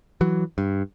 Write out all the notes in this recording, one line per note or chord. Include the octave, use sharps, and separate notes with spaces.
E3 F#3
G2